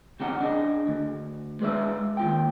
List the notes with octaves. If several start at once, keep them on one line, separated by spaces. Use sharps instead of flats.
C#3 C4 D#4 G4 F#5
D4 G#4 D#5
D2
G#3 G#4 B4 D5 E5
D#2 F4 G5